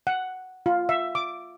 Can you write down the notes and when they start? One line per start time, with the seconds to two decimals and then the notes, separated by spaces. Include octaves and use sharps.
0.07 F#5
0.66 F4
0.89 E5
1.15 D6